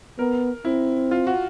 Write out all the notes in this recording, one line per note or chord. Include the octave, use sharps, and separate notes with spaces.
B3 A#4
C4 E4
F4
F#4